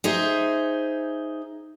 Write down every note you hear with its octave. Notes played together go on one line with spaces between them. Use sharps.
D#4 G#4 C5 E5